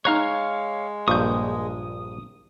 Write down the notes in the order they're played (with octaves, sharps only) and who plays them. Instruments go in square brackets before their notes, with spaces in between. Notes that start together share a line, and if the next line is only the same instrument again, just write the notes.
[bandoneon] G#3 [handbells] D#4 A#5 F#6 [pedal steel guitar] C#5 F5 F6
[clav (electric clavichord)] A#1 G2 A#2 [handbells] C#6 G6 [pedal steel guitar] D#6